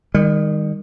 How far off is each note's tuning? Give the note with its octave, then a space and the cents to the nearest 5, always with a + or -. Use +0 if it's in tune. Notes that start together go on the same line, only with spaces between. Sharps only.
D#3 +0 G3 +45